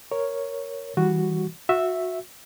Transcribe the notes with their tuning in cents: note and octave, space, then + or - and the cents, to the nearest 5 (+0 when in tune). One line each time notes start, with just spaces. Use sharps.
A#4 +0 C#5 +0
E3 -25 G3 +5 F#4 +0
F#4 -20 E5 +0